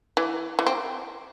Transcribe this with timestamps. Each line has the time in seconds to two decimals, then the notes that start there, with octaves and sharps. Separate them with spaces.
0.17 E3
0.59 E3
0.67 C4